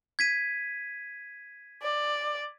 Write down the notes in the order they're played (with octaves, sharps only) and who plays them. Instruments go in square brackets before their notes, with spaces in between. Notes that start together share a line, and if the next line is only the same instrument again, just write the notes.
[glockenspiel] G#6 B6 D#7
[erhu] D5